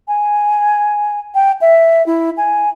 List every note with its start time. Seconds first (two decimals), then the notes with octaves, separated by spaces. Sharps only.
0.08 G#5
1.35 G5
1.61 E5
2.06 E4
2.37 G#5